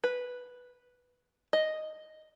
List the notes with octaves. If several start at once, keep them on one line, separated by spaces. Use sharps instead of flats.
B4
D#5